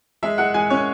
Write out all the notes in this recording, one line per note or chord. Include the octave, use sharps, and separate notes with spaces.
G#3 E5
G#3 F#5
G#3 G#5
C#4 C#5